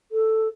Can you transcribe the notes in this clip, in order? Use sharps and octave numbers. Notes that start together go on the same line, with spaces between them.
A4